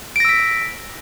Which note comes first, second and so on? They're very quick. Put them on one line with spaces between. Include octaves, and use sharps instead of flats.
D7 A#6 E6 B6